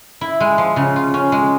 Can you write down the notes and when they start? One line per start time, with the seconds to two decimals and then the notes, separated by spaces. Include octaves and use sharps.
0.21 E4
0.40 G#3
0.58 F3
0.76 C#3
0.96 F4
1.14 C#4
1.32 G#3